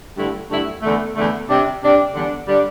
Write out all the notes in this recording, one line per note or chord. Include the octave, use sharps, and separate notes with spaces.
G2 D3 A3 E4
G2 D3 A3 E4
E2 D3 A3
E2 D3 A3
C3 G3 D4
C3 G3 D4
E2 D3 G3 D4
D3 G3 D4